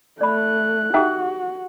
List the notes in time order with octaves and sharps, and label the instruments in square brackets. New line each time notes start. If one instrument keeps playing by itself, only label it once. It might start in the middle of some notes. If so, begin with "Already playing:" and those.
[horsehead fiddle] A3 [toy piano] D5 B5 [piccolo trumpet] F#6
[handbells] D#4 E5 G5 [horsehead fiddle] F#4 [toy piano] G4 A4